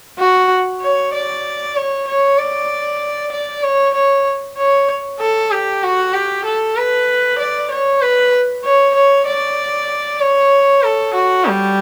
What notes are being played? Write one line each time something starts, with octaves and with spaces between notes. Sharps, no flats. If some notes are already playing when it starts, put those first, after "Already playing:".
F#4
C#5
D5
C#5
C#5
D5
D5
C#5
C#5
C#5
A4
G4
F#4
G4
A4
B4
D5
C#5
B4
C#5
C#5
D5
C#5
A4
F#4
G3